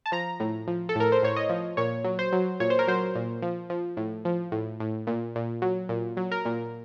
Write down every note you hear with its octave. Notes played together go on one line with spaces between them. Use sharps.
A5
F3 A#5
A2
F3
A4
A2 A#4
C5
A2 C#5
D#5
F3
A#2 C#5
F#3
C5
F#3
A#2 C#5
C5
A#4
F#3 C5
A#2
F3
F3
A2
F3
A2
A2
A#2
A#2
F#3
A#2
F#3
A#4
A#2